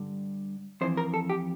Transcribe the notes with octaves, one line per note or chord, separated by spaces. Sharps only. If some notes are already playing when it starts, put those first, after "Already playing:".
Already playing: G2 D3
F2 E3 C5
A#4
A4
G4